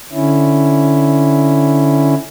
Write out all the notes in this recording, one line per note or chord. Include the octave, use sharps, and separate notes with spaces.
D3 C#4 E4